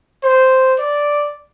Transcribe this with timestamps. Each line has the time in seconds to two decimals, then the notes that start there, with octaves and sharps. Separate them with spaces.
0.23 C5
0.78 D5